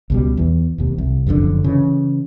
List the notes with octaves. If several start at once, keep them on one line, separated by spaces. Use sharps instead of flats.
C#2 B2 G3
E2 E3
E1 D#2 C3
C2
F#1 F2 A#2 D3
C#3 E3